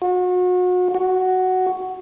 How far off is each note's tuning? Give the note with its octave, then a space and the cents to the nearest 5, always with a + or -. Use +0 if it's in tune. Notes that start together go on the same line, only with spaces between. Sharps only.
F#4 -35
F#4 +5